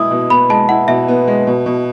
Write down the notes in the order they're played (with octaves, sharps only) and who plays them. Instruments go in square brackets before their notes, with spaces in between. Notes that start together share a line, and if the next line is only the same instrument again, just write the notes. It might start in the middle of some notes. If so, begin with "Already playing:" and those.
Already playing: [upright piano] B2 G#3 B3 E4 [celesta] D#6
[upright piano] B2
[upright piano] B3 [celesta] B5
[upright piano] G#3 [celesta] A5
[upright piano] E4 [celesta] F#5
[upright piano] B2 [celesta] E5
[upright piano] B3
G#3
B2
B2